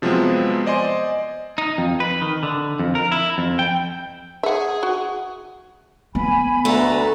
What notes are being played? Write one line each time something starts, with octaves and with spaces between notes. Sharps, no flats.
C3 F3 F#3 G#3 B3 C4
C5 D5 D#5 G#5 C6
D#4
F2
B4
D#3
D3
F2
A#4
E4
F2
G5
G#4 E5 F#5
F#4
B3 G#5 B5
D2 A3 B4 A#5